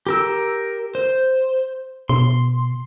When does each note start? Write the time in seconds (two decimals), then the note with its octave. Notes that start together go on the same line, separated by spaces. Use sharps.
0.07 G4 A#4 E6
0.95 C5
2.09 B2 C6